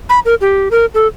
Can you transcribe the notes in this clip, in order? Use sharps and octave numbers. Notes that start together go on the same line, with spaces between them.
B5
A#4
G4
A#4
A4